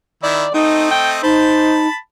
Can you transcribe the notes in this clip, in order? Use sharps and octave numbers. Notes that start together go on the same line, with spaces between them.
D#3 E4 D5
A3 C4 D#4 D#5
G5
D#4 C5 A5 B5